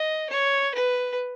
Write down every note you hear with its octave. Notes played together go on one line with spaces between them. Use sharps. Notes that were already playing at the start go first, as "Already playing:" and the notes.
Already playing: D#5
C#5
B4